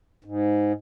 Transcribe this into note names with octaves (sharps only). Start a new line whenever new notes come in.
G#2